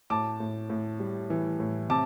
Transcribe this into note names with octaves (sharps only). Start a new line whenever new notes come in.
A2 A5 D6
A2
A2
G3
E3
A2
C3 A5 D6